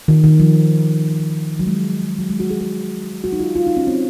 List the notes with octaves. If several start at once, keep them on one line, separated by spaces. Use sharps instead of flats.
D#3
D#3
F3
F#3
G#3
F#3
G#3
F#4
G#4
G#4
F#4
D#4
F4
F4
D#4
C#4
C4